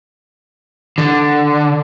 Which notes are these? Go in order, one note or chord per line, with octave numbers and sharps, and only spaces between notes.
D3